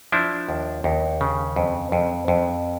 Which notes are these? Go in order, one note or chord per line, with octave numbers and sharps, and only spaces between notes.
F3 D4 E4
D#2
D#2
C#3
F2
F2
F2